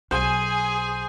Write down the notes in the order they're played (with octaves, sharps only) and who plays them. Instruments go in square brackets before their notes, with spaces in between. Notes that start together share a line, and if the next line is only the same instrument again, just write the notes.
[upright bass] B1 [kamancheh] G#4 G#5 [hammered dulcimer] C5